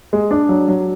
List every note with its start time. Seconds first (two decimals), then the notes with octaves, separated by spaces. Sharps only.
0.13 G#3
0.31 D4
0.49 F#3
0.68 F#3